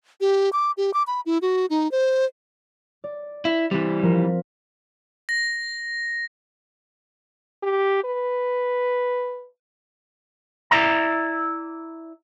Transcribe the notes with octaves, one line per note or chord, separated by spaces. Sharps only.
G4
D6
G4
D6
B5
E4
F#4
D#4
C5
D5
E4
E3 G3 C4
F3 A#4 B5
A#6
G4
B4
E4 D5 E5 A#5